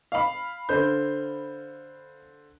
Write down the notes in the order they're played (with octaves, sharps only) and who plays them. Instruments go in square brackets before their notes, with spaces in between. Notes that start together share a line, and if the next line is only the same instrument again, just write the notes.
[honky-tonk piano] F5 B5
[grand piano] D3 C5 G6